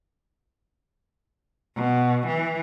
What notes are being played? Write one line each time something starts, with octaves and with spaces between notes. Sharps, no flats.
B2
E3